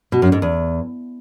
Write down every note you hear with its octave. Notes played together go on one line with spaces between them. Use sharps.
B2
F#2
G#2
E2